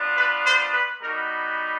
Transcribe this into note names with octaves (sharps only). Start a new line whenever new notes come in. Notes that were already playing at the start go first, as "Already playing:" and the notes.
Already playing: B3 D4 F4
B4
C5
B4
G3 B3 D#4 F#4 A#4